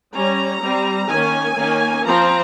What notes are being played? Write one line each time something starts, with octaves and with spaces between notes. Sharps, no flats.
G3 C#4 A#5
G3 C4
D#3 A#3 C#4 G#5
D#3 A#3 C#4
F3 C4 A#5